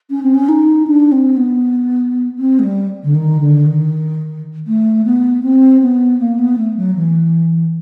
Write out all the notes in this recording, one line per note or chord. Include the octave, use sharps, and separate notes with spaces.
C#4
C4
C#4
D#4
D4
C4
B3
C4
G#3
G3
D3
D#3
D3
D#3
A3
B3
C4
B3
A#3
B3
A3
F#3
E3